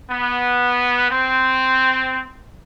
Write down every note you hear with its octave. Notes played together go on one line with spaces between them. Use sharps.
B3
C4